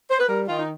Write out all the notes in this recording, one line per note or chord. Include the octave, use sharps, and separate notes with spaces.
C5
B4
G3 A#4
D#3 F4
D#4